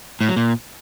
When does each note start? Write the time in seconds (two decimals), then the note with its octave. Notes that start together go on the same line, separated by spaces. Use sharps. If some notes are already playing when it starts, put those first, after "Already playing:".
0.21 A2
0.29 F#3
0.37 A#2